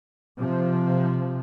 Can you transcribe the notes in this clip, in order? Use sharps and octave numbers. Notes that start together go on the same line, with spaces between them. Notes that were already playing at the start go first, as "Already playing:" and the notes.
C3 F3